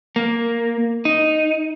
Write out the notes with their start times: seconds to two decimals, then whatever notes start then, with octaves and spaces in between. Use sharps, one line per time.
0.16 A#3
1.05 D#4